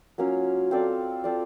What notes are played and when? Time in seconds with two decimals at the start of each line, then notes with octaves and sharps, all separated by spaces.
0.18 F#3 A#3 C#4 F4
0.71 C4 F4 A4 D5
1.24 C4 F4 A4 D5